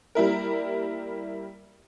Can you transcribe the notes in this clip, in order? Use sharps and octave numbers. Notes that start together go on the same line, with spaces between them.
G3 A#3 E4 A#4